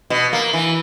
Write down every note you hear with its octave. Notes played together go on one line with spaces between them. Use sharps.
B2
A#3
E3